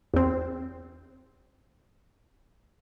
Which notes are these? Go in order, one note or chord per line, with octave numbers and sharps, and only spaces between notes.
E2 C4